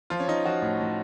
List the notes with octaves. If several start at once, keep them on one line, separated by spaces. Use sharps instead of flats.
F3 F4
C#4
F3 D#4
F3 F#4
A2
A2